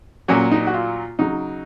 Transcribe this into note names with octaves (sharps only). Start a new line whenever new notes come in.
A#2 F#3 C#4
D#4
F#4
F4
C#3 F#3 D#4